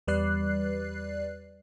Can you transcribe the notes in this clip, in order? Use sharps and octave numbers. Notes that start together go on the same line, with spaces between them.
E2 G3 B4 D5 F#6 C7